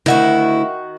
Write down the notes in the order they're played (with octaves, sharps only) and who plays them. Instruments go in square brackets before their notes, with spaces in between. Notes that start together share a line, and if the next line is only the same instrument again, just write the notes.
[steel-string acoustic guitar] D2 E4 [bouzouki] D#3 F#4